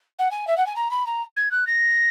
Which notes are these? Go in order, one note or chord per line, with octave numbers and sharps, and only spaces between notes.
F#5
G#5
E5
F#5
G#5
A#5
B5
A#5
G#6
F#6
A#6